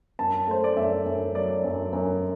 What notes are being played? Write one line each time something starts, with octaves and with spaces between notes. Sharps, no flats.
F#2 A5
A3 C5
D5
F#2 E5
F#2
F#3 D5
F#2
F#2